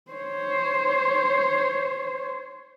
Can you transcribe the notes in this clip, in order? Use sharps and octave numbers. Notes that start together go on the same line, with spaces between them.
C5 C#5